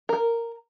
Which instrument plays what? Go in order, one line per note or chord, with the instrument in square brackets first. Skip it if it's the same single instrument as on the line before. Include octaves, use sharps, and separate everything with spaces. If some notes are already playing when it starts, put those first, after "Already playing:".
[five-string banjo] A#4